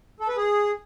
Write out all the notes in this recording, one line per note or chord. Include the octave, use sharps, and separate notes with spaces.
A4
B4
G#4